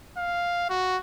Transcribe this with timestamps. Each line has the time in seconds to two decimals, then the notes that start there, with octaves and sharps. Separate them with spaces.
0.17 F5
0.69 F#4